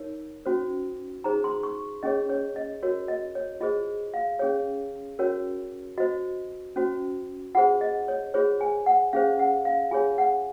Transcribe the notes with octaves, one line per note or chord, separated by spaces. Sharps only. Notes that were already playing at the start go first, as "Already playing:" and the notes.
Already playing: D#4 A#4 C#5
C#4 F#4 C5
D#4 G#4 C5 A#5
C6
C#6
C#4 G#4 C#5 D#5
C#5
D#5
F#4 A#4 C#5
D#5
C#5
F4 G#4 C5 D#5
F5
C#4 G#4 C#5
C#4 F#4 A#4 C#5
F#4 C5 D#5
C#4 F#4 C5
F4 G#4 C5 F#5
D#5
C#5
F4 G#4 C5 C#5
G#5
F#5
C#4 G#4 C5 F5
F#5
F5
F4 G#4 C#5 G#5
F#5